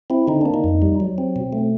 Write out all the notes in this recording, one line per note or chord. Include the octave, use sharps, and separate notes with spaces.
C4 E4
D3 D#4
A#3 D4
D#4
F2
G3
F#3
C4
B2
A3